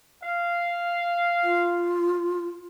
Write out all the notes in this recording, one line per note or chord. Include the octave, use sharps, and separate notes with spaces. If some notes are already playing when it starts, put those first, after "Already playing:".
F5
F4